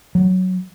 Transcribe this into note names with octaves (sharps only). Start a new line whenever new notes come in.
F#3